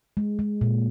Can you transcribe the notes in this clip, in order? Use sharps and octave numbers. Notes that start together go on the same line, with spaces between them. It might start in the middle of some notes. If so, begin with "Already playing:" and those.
G#3
G#3
A#2